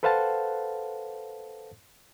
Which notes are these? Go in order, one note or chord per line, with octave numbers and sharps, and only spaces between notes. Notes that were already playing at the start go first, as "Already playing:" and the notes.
A4 B4 C5 F5 F#5 A5